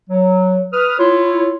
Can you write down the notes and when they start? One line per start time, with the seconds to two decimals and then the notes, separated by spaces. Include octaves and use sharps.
0.09 F#3
0.73 B4 D#6 F6
0.98 E4 F4 C#5